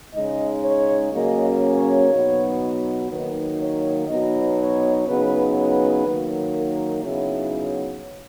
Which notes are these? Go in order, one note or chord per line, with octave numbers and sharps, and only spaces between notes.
C#3 G#3 D#4 D#5
C#5
C#3 F#3 A#3 C#4 D#5
C#5
B2 F#3 B3 D#4
D#3 F#3 A#3 D#4 B4
C#5
B2 F#3 B3 D#4 D#5
C#5
C#3 F#3 B3 D#4 B4
B4
D#3 F#3 A#3 D#4
A#4
C#3 F#3 B3 D#4 E4